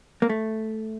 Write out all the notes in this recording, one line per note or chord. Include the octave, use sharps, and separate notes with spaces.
A#3
A3